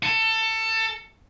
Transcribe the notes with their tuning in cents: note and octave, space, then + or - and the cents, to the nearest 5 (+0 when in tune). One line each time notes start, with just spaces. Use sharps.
A4 +20